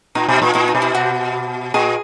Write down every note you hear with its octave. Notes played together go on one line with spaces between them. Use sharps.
A#2 D#4
B2
A#2
A#2 E4
D#4
B2
E4
F#4
A#2 G#4